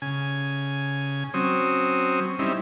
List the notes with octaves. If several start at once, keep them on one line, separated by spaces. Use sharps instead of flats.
C#3 G#5
F#3 C4 C#4 D#6
G3 C4 C#4 D#4 E4